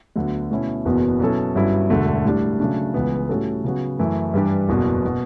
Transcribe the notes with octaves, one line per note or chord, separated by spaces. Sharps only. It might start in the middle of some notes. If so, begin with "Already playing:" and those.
D2 D3 F#3 B3
B2 A3 C#4 E4
F#1 E2 B2 F#3 B3
B2 F#3 C#4 E4 A4
G1 G2 F#3 C#4 E4
E1 D2 D3 A3
A2 G3 D4
C#3 F#3 A3 D4
C#2 C#3 E3 B3
A2 G3 C#4 F#4 A4
C#3 F#3 B3 F#4
F#2 E3 A3 E4 B4
G2 E3 G3 D4 G4
F#1 E2 B2 F#3
B2